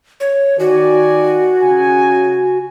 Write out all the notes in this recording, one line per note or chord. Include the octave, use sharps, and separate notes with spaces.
C#5
D#3 F#4 D5 G#5
C#3 G#5